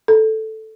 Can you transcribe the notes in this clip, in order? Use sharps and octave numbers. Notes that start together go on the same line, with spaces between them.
A4